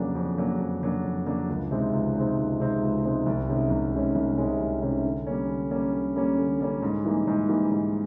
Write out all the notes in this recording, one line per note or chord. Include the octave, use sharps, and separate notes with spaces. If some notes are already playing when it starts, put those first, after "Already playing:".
Already playing: F2 C#3 F#3 A#3 D4
F2
C#3 F#3 A#3 D4
F2
C#3 F#3 A#3 D4
F2
C#3 F#3 A#3 D4
C#2
C3 D#3 G#3 C4
C#2
C3 D#3 G#3 C4
C#2
C3 D#3 G#3 C4
C#2
C3 D#3 G#3 C4
C2
C3 D#3 G#3 C#4
C2
C3 D#3 G#3 C#4
C2
C3 D#3 G#3 C#4
C2
C3 D#3 G#3 C#4
D3
G3 A#3 C#4
D3
G3 A#3 C#4
D3
G3 A#3 C#4
D3
G3 A#3 C#4
G#2
E3 G3 A#3 D#4
G#2
E3 G3 A#3 D#4
G#2